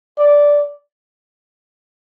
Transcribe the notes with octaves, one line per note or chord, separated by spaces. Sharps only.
D5